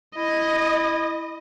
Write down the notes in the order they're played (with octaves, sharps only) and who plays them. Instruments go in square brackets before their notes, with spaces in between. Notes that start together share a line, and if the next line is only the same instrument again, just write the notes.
[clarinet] E4 [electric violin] D#5